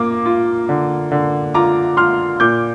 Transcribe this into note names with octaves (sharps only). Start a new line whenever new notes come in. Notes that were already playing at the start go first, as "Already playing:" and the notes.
Already playing: A#3 F4 D6
F4
D3
D3
F4 A#5 D6
F4 C6 F6
A#2 D6 G6